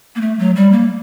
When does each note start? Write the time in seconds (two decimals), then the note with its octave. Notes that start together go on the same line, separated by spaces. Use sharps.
0.16 A#3
0.21 A3
0.39 F#3
0.56 G3
0.72 A#3